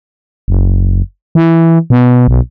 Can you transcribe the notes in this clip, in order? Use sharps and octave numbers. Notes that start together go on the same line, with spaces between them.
F#1
E3
B2
B1